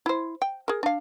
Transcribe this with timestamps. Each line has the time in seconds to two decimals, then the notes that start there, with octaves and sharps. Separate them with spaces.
0.06 E4 C5
0.42 G5
0.68 G#4 A#4
0.83 D4 F5